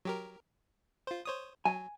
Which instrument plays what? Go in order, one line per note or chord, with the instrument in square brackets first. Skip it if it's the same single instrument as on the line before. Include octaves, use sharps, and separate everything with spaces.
[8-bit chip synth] F#3 G4 A#4
F4 C5
C5 C#5 D#6
[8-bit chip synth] F#3 [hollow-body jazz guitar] G#5